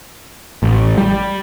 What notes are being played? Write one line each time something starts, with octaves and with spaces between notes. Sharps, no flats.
A1
G3